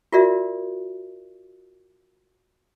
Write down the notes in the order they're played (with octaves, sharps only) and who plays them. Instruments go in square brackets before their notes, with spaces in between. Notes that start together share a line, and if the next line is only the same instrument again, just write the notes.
[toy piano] F4 F#4 A#4 D5 E5